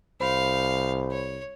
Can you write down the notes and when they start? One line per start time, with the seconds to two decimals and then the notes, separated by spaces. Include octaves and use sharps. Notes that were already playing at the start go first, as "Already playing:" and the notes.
0.21 C2 C5 F5 B5
1.11 C#5